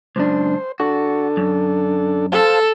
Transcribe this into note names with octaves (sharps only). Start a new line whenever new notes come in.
C#2 F#2 D4 C5
D4 F#4 A4
F#2
A4 C5 F5 A5